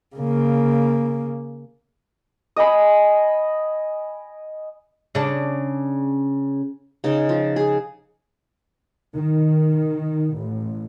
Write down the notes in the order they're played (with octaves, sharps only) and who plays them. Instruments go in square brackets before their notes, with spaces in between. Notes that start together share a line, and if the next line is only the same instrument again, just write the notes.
[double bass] C#3 A#3
[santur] D#5 G5 G#5 B5
[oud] C#3 D4
[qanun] C#3 D#4
F3
G#4
[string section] D#3
A1